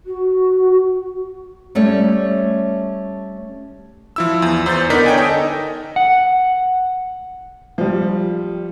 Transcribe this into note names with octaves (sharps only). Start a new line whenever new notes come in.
F#4
G3 A3 C#4 C#5
F3 E4 E6
E2
E2 C5 G6 A6
D3 B3 D#4 A#4 D5 B6
C#5 G5 G#5
D#4 A4 D#5
F#5
F3 G3